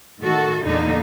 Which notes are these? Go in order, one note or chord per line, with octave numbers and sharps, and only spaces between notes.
A2 D#3 F#4 A4
E2 A#2 D3 A#3 D#4